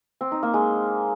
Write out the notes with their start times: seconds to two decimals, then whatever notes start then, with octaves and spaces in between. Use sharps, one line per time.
0.21 C4
0.32 D#4
0.43 A#3
0.54 G#3